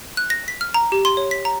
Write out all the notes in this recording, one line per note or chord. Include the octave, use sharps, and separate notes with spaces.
F#6
A#6
B6
F6
A#5
G4
C6
C#5
B6
A#5